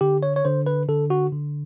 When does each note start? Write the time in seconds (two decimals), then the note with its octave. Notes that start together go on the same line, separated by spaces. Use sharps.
0.01 D3 G4
0.23 C#5
0.36 C#5
0.45 D3 C5
0.66 B4
0.88 D3 A4
1.10 F#4
1.32 D3